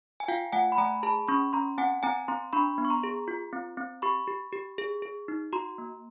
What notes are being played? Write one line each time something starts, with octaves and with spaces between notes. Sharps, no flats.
G#5
F4 F5 G5
A3 F#5 G#5
B5
A3 G#5 A#5
G#4 A5 B5
C#4 B5 C#6
C#4 A#5 C6
C4 F#5 G#5
C4 G#5 A#5
C4 A#5 C6
D4 B5 C#6
B3
C#6
A#5 C6
G#4
F4
C4
C4
G4 B5 C#6
G4
G4
G#4
G#4
D#4
F#4 A#5 C6
A#3